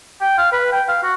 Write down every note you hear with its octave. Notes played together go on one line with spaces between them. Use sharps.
G5
F5
B4
G5
F5
F#4